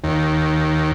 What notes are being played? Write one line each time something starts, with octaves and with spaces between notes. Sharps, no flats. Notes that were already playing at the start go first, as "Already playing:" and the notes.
D#2